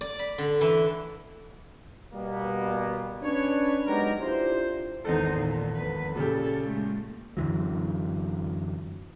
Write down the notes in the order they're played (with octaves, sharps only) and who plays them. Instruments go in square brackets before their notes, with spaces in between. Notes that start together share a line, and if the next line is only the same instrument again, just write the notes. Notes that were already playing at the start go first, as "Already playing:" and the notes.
[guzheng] D5
B5
D3
E3
[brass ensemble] B2 G3 A#3 B3
C#4 D4 B4 C#5
F#3 G#3 B3 D#4 G4 A#4
D4 E4 F4 G4 C5
[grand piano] G#1 E2 A4 [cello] D#4 C5
[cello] A#2
F2 B4
[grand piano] A#2 C#3 G4 [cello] A4
[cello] G#3 A3
[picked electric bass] F#2 D3 E3 F#3